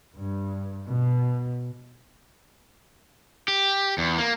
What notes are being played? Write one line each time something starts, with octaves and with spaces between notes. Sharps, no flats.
G2
B2
G4
E2
A#3